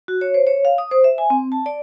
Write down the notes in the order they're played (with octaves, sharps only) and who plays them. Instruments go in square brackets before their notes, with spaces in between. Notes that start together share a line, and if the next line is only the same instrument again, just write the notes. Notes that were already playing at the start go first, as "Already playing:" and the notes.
[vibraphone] F#4
C#5
C5
C#5
F5
D#6
C5
E5
G#5
C4
A5
D5